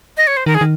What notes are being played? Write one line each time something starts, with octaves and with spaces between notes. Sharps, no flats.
D#5
C#5
C5
D#3 A#4
G#4
D#3